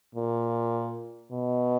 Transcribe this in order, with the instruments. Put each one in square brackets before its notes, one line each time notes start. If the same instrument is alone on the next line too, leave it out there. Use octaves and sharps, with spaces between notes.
[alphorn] A#2
B2